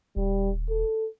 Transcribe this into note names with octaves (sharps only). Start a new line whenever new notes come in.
D#1 G3
A4